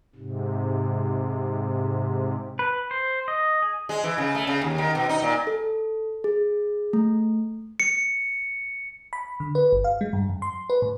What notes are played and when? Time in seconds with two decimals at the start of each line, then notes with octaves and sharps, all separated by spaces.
0.15 G#2 C3
2.59 B4
2.91 C5
3.28 D#5
3.62 G#4
3.89 G#3
4.04 E3
4.18 C#3
4.35 A3
4.47 C#3
4.62 D#2
4.78 D#3
4.95 B2
5.09 D#4
5.22 A#2
5.47 A4
6.24 G#4
6.93 A3
7.80 C#7
9.13 B5
9.40 D3
9.55 B4
9.73 G1
9.84 F5
10.01 G#3
10.13 G2
10.29 F#2
10.42 C6
10.70 B4
10.82 A2